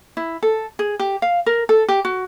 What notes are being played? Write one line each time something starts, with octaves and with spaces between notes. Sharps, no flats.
E4
A4
G#4
G4
F5
A#4
A4
G4
F#4